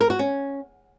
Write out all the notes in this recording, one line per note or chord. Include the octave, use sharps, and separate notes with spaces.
A#4
F#4
C#4